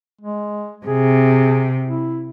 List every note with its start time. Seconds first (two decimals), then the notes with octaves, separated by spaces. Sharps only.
0.21 G#3
0.86 C3 G#4
1.86 E4